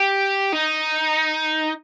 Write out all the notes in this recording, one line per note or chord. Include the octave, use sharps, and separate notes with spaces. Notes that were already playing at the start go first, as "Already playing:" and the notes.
Already playing: G4
D#4